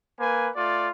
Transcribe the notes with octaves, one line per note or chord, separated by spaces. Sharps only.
A#3 B4 G#5
A3 F4 D5